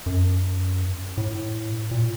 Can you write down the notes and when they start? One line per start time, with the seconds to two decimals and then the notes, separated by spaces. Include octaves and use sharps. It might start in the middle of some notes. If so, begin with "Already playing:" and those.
0.06 F#2
1.17 A2
1.91 A#2